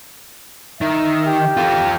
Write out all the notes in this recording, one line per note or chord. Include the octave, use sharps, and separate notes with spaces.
D#3 E5
G4
F4 A4